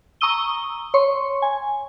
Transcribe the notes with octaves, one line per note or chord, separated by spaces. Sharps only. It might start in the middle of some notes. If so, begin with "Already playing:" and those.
A#5 C#6 D#6 E6 D#7 G7
C#5 C6 C#6
G#5